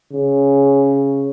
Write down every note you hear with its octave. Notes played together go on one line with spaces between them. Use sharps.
C#3